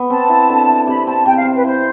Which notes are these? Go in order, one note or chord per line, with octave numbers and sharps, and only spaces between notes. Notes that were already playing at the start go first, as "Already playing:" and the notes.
Already playing: B3
C4 A5
E4
D3
E4
C3 B5
C4 A5
C3 G5
F5
C4
B4
E4 C5